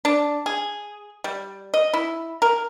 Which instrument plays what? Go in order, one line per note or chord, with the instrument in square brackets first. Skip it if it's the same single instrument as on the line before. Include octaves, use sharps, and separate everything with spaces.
[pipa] D4
G#4
G3
D#5
E4
A#4